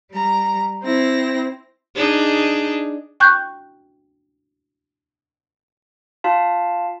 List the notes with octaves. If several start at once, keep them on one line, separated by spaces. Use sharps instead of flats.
G3 A#5
C4 E4 A#6
D4 D#4 G#4
G5 C#6 F#6 G6
F4 F5 A5